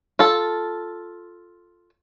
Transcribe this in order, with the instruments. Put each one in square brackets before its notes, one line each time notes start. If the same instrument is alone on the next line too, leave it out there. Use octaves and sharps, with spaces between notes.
[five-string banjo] F4 A4